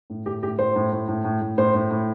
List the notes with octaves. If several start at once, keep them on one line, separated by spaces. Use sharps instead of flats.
A2
A2 G4
A2 G4
A2 C5
A2
A2
A2
A2
A2
A2 C5
A2
A2